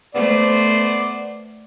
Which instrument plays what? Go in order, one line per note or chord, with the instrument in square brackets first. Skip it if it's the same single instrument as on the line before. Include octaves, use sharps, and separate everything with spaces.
[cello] A3 C5 [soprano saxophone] B3 [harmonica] D5